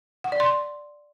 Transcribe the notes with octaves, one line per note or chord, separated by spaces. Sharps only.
F#5
D5
C6